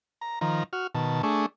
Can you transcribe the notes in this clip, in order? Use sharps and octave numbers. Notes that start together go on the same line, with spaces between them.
A#5
D#3 F3 A#5
F#4 F6
B2 D#3 A5
A3 D4 G#4 C#6